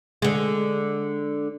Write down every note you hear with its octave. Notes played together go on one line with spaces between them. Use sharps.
D3 G#3